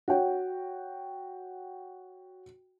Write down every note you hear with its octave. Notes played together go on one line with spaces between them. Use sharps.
F#4 C#5 G5